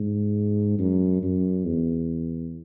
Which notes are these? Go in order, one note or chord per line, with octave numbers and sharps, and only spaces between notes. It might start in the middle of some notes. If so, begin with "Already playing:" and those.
Already playing: G#2
F#2
F#2
E2